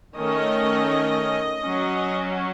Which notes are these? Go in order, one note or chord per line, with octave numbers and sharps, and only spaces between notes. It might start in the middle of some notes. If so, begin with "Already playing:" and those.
D#3 A3 C#4 D#5
F#3 C#4